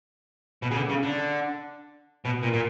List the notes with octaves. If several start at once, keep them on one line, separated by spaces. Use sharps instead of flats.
B2
C#3
D3
C#3
D3
B2
A#2
A#2